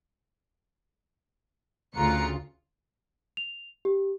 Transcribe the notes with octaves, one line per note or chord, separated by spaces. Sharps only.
D2 C#3 F4 A#5 F#6 C#7
F7
G4